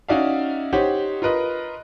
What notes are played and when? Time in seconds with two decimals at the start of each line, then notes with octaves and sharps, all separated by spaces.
0.08 C#4 D#4 F#4 D5 E5 F5
0.73 D#4 G4 C5 C#5 F#5
1.22 F4 A#4 B4 D#5